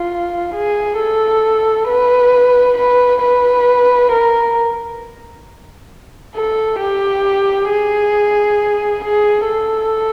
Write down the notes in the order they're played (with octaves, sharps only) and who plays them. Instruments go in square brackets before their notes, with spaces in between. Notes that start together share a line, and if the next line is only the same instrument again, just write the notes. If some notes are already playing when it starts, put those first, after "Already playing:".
Already playing: [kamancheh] F4
G#4
A4
B4
B4
B4
A#4
A4
G4
G#4
G#4
A4